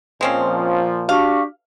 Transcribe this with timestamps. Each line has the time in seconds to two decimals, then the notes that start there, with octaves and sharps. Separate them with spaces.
0.21 A#2 F3 G#3 C4 C#4
1.09 D4 F#4 G4 F5